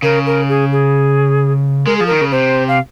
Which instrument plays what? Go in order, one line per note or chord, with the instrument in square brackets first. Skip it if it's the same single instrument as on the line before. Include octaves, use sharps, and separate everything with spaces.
[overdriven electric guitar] C#3 [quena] A#4
[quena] A#4
G#4
G#4
[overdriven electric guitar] G#3 [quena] A#4
[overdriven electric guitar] F3 [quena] G#4
[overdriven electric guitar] D#3 [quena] A#4
[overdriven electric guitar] C#3
[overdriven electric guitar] C3 [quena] C5
[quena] F5